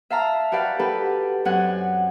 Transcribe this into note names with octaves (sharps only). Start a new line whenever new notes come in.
E5 F5 A5 A#5
F#4 G4 B4 D5 F5
F#4 G4 A4 B4
F#2 C4 F#4 F#5 G#5 F#6